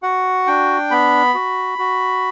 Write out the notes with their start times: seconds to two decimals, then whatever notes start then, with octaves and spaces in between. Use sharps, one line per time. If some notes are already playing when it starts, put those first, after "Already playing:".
0.03 F#4 F#5
0.47 D4 G5
0.91 B3 B5
1.34 F#4
1.79 F#4